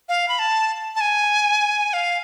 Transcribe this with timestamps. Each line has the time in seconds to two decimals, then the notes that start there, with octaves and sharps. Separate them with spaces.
0.09 F5
0.29 B5
0.39 A5
0.96 A5
1.01 G#5
1.93 F5